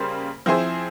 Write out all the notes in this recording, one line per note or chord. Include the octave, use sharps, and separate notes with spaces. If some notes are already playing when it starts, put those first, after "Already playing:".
Already playing: C#3 G3 A#3 C5
F3 C4 E4 G#4 C5